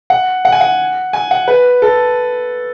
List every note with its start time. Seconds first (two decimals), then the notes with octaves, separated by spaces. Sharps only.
0.10 F#5
0.45 F#5
0.52 G#5
0.61 F#5
1.13 G#5
1.31 F#5
1.48 B4
1.82 A4